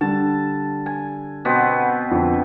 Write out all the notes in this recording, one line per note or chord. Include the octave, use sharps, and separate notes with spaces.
D3 G3 A5
G#5
B2 B3 C4
F2 D3